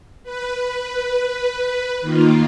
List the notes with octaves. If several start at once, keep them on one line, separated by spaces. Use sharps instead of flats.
B4
D#3 A#3 F4